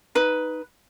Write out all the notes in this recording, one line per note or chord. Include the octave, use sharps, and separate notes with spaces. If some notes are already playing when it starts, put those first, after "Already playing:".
D#4 B4